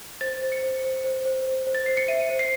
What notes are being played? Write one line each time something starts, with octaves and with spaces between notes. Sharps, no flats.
C5 A6
C5
C#7
C5
C5
C5
C5
C5
C5
A6
C5 C7
C#7
E5 D#7
C5
C7